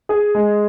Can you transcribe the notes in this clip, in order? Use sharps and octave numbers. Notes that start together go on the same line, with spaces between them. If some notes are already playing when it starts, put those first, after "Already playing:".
G#4
G#3